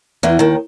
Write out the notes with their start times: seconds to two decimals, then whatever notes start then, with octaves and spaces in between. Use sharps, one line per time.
0.23 E2 E3
0.39 D#2 D#3